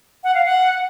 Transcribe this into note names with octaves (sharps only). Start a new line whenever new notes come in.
F#5
F5
F#5